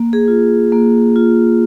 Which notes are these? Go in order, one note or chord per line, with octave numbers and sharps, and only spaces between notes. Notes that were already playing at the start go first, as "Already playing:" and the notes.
Already playing: A#3
G#4
F4
A#3
F4